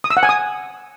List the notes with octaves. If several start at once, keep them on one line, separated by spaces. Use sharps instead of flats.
D#6
E6
F#5
G#5
D#6